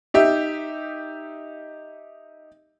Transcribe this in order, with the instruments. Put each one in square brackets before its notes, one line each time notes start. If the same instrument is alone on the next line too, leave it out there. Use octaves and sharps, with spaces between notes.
[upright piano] D#4 G4 E5